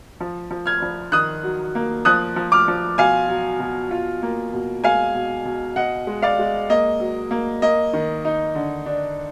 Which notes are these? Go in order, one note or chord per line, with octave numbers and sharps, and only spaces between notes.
F3
F3
F6 G#6
F3
D#3 D#6 F#6
F#3
A#3
F3 D#6 F#6
F3
D6 F6
F3
B2 F5 G#5
F#3
B2
F4
A#3
B2
G#3 F5 G#5
B2
B2
B2 D#5 F#5
G#3
D5 F5
G#3
A#3 D#5
F#3
A#3
A#3 D#5
D#3
D#4
D3
D4